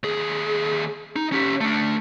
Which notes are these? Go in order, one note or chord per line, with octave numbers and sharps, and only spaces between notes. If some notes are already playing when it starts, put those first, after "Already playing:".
D#2 G#4
D#4
C#4 G4
A3 D4